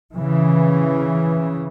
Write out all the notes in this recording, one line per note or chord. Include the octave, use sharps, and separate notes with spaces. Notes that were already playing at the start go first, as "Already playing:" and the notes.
C#3 E3